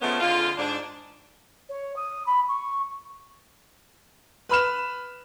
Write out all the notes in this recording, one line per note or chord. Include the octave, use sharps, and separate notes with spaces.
C#3 F3 G#3 A3 B3 C#4
F2 D3 G#3 F4
G#2 D4
C#5
D#6
B5
C#6
B4 B5 F6 E7